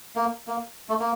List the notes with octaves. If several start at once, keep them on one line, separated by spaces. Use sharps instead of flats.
A#3
A#3
A3
A#3